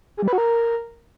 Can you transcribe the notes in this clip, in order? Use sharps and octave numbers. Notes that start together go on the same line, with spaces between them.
G#4
G3
B4
F#4
A#4